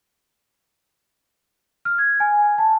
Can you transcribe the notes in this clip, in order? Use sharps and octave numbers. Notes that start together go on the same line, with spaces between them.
F6
G#6
G#5
A5